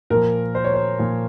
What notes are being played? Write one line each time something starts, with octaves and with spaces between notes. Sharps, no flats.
A#2 F3 A#4
C5
C#5
C5
A#2 F3